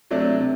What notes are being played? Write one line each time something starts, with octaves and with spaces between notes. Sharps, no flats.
C3 F#3 A3 D4
C3